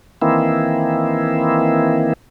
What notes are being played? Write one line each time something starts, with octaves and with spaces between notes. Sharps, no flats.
D#3 E3 A#3 C4 E4